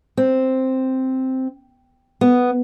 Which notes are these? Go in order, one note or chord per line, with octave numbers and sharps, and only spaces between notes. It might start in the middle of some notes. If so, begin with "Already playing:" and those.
C4
B3